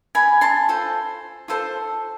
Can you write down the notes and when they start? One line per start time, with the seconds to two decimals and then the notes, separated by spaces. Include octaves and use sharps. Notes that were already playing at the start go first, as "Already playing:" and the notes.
0.15 G#5 B5
0.41 A5 C6
0.69 F4 A4 C5
1.48 F4 A4 C5